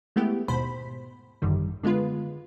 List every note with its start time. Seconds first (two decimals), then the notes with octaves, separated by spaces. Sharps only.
0.16 G#3 A3 B3 E4 G4
0.48 D#2 G#2 B2 C5 B5
1.42 G#1 F#2 D3 D#3 G3
1.83 D3 G#3 B3 F4 B4